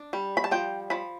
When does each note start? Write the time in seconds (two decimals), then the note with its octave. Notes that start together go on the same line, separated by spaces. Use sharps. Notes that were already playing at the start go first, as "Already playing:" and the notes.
Already playing: D4
0.13 G3
0.37 B5
0.44 A5
0.51 F3 G5
0.90 F3 B5